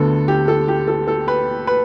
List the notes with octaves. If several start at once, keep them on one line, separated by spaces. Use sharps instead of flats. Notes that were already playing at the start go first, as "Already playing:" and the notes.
Already playing: D2 D3 B3 A4
G4
A4
G4
A4
A4
B4
B4